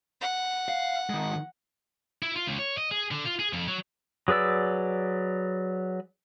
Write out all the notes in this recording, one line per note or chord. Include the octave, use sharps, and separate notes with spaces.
F#5
F5
D#3 G#3
E4
F4
C#2
C#5
D#5
G#4
D3
F4
G#4
F2
F#3
F#3 G#4 B4 D5 E6